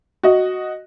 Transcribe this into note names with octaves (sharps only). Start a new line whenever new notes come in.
F#4 D#5